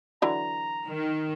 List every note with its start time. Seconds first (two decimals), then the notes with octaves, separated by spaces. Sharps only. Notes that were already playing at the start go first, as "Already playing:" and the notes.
0.22 D3 E3 F#3 A#5
0.88 D#3